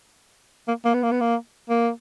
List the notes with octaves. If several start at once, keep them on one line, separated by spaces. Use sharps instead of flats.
A#3
A#3
B3
A#3
B3
A#3
A#3